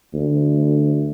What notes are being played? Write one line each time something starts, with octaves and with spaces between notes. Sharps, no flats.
D2